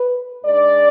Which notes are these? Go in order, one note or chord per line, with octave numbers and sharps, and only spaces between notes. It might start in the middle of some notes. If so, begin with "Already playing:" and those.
Already playing: B4
G#2 G#3 D4 D5